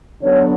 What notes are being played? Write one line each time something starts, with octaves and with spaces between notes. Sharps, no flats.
D3 F#3 B3 D4 C#5